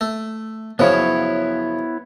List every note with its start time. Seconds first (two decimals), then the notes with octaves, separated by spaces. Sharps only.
0.01 A3
0.79 F#2 C#3 F3 B3 E4 C#5